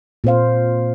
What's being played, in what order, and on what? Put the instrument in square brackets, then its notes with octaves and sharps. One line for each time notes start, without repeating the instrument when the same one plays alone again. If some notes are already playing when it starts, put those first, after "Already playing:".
[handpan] A#2 C4 C5 F5